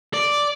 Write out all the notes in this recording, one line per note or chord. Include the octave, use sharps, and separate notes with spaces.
D5